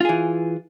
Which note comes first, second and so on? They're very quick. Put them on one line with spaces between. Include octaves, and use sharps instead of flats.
F4 G#4 E3